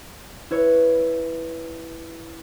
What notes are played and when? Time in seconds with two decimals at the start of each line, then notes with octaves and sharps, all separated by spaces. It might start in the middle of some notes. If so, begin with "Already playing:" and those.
0.51 E4 B4 C#5